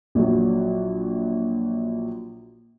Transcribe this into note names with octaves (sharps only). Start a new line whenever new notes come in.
A#1 F#3